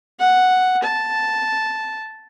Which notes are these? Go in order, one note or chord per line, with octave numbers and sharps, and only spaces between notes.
F#5
A5